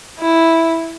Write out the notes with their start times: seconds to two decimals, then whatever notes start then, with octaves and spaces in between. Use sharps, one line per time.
0.20 E4